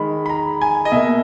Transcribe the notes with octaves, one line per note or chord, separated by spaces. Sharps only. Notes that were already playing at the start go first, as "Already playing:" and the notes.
Already playing: D#3 G#3 B5
B5
A#5
G#5
D#5
B2 A#3 E5